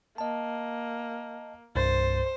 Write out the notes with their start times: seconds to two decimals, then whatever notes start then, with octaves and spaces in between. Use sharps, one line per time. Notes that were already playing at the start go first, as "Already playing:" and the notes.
0.18 A#3 D#5 A5
1.76 C2 G2 C5 A6